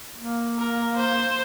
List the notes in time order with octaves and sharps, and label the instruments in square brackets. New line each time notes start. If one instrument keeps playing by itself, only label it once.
[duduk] A#3
[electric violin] A#4
C5